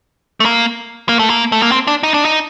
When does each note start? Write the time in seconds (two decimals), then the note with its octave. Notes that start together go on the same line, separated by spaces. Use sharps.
0.40 A3
0.45 A#3
1.09 A#3
1.19 A3
1.30 A#3
1.52 A3
1.62 A#3
1.72 C4
1.87 D4
2.03 D#4
2.14 D4
2.25 D#4